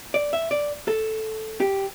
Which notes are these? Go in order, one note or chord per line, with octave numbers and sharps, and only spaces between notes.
D5
E5
D5
A4
G4